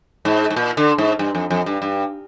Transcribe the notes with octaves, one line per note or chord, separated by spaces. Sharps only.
G#2
G#2
A#2
D3
G#2
G2
F2
F2
G2
G2